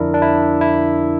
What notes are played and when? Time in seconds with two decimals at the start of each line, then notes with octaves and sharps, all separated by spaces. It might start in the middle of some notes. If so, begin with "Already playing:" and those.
Already playing: F2 D3 F3 D4 E4 A#4 D5
0.14 D4
0.22 E4
0.61 E4